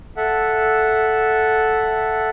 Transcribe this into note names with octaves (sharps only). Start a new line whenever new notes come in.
A4 E5 F#5